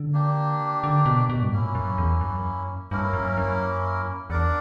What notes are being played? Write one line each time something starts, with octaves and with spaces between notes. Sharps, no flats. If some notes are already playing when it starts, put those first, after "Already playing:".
Already playing: D3
A#3 D4 G4
D3
B2
B2
G2
A#2 A#3 C#4 E4
F#2
E2
F#2
G2 A#3 C#4 E4 A#4
F#2
F#2
E2 D4 A#4 D5 F#5